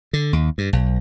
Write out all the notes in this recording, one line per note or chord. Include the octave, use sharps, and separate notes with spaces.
D3
D#2
G2
B1